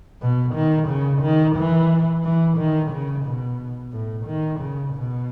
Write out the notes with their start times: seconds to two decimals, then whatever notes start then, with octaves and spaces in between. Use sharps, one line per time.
0.22 B2
0.55 D#3
0.88 C#3
1.22 D#3
1.56 E3
2.24 E3
2.58 D#3
2.92 C#3
3.25 B2
3.92 A2
4.27 D#3
4.60 C#3
4.94 B2